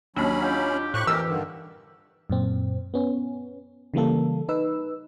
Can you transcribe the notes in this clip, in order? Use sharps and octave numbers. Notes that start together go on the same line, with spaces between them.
D#2 F#3 C#4 D4 B5
D#4 F4 G4
F2 A2 G4 C#6 F#6
E3 A#4 E6
G2 D3 D#3
F#2 A#2 C4
B3 C#4
C#3 E3 G3 A#3 A4
D#4 B4 E6